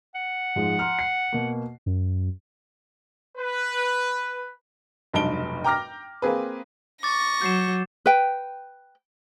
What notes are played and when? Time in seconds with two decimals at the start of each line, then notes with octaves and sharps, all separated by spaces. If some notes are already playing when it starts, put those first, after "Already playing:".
0.15 F#5
0.56 G#2 F3 G#3
0.79 A#5 C6 F6
0.99 C7
1.33 B2 A#3
1.86 F#2
3.38 B4
5.14 F1 B1 G2 A5 D7 G7
5.64 G5 A#5 D6 F6 A#6
6.22 A#3 C4 G#4 B4
7.03 C#6 D6 A6 A#6
7.41 F#3 G6 C7 E7
8.06 B4 G5